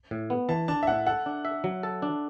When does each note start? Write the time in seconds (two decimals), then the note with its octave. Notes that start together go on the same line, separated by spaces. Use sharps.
0.11 A2
0.30 B3
0.49 E3 A5
0.68 D4 A5
0.83 E5
0.87 A2 F#5
1.07 A4 F#5
1.26 D4
1.45 E5
1.64 F#3
1.83 A4
2.02 D4